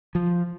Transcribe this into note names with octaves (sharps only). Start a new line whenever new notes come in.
F3